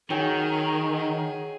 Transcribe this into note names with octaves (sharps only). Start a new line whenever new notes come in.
D#3 F#3 G#4 G5 G#5